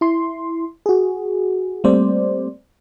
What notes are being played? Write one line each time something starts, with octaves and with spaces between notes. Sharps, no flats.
E4 C6
F#4 G#4
G3 A3 A#3 C4 C5 D5